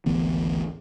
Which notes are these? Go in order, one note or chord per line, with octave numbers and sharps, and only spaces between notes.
G#1 D2 E3 B3